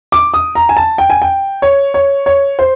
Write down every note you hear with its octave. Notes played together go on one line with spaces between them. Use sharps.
D6
D#6
A#5
G#5
A5
G5
G#5
G5
C#5
C#5
C#5
C5